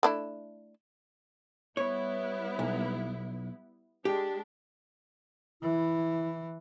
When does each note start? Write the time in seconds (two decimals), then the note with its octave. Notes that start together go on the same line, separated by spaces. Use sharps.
0.03 A3 D4 E4
1.77 G3 B3 E4 C#5
2.59 B1
4.05 G#3 D4 G4
5.62 E3 E4